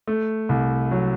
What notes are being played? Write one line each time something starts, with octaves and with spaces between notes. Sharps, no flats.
A3
C2
F#3